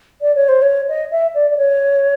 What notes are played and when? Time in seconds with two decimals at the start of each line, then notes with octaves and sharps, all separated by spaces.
0.21 D5
0.35 C#5
0.48 C5
0.62 C#5
0.89 D#5
1.11 E5
1.34 D5
1.51 D5
1.57 C#5